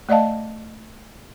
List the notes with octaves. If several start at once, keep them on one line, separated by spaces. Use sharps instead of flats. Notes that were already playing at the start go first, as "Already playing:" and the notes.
A3 D5 D#5 F5 A5